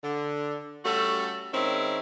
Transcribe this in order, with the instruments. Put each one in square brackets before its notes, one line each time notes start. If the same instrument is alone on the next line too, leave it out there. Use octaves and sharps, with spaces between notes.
[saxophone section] D3
G3 A3 C#4 F#4 A4
D#3 G#3 C4 C#4 E4